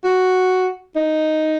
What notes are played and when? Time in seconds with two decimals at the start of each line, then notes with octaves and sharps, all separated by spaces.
0.04 F#4
0.96 D#4